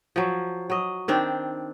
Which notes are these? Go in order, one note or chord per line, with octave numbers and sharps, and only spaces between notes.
F3 F#3
F#3 D#5
D#3 C4 D4